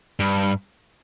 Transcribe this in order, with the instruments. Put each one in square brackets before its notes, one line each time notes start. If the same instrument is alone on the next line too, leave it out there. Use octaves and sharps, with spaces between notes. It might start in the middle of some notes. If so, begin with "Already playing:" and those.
[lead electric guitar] G2